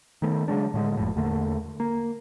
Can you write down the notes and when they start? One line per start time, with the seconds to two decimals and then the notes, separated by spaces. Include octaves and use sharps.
0.22 D#3 A3 B3
0.48 C#3 F#3 G#3 D4
0.74 A2 D3 G#3
0.97 F#1 F2 A2
1.16 E2 D3 A3 A#3
1.80 A#3